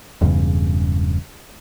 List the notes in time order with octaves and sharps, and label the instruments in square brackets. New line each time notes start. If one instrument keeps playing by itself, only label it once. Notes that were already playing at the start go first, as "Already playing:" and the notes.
[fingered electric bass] E1 E2 G2 C#3